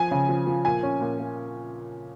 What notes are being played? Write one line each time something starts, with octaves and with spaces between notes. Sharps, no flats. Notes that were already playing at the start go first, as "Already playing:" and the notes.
Already playing: F3 G#5
C#3
F3
F3
A#2 G#5
C#4
A#2
A#2